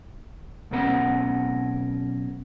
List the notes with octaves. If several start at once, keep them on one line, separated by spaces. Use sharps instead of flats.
B1 B2 C4 C#4 A#4 F#5